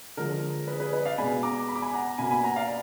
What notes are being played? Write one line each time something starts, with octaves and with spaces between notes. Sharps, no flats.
D3 F3 G#3 A#4
G#4 B4
G#4 B4
B4 D#5
D5 F5
B2 G#3 B3 G#5 B5
A#5 D6
B5
D6
G#5 B5
F#5 A#5
B2 A#3 G#5 B5
G#5 B5
F#5 A#5
D5 F5